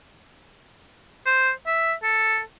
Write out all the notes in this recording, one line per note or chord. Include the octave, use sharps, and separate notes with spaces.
C5
E5
A4